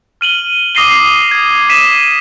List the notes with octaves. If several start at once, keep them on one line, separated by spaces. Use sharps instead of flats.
F6 D#7 F#7 G7
D6 D#6 A#6 C7 D#7 G7
G#6
B6 D#7 E7